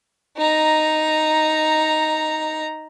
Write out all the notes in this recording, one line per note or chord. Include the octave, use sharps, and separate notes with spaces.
D#4 A#5